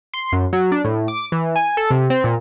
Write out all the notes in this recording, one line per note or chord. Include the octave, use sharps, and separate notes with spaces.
C6
F#2
F#3
D4
A2
D6
E3
G#5
A4
C3
C4
A#2